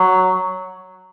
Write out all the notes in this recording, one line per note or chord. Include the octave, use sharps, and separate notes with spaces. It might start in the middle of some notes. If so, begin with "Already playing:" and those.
Already playing: F#3